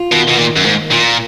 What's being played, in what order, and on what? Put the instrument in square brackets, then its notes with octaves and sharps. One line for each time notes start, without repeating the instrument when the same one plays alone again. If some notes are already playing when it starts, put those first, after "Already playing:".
Already playing: [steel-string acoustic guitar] F4
[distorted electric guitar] B2 [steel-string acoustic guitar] D#3
[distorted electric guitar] B2
[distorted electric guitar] A#2 [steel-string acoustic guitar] D#3
[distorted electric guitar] F#2
[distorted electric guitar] G#2 [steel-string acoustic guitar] A#3
[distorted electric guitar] A#2 [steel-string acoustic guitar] F4